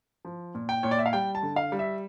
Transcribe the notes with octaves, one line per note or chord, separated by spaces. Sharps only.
F3
A#2
G5
A#2 C#5
D5
E5
F5
G3 G5
A5
D3
F5
G3
E5